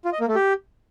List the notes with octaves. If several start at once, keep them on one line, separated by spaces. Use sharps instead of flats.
F4
D#5
A#3
A3
G4